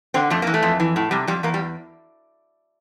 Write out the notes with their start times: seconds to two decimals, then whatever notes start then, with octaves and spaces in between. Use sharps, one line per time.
0.14 D3 C4
0.30 F2 A3
0.42 E3 A#3
0.54 A3
0.63 F2
0.80 E3
0.96 A2
1.11 C3 G3
1.27 F2 G3
1.43 E2 A#3
1.54 G3